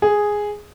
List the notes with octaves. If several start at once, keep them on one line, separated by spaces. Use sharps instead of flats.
G#4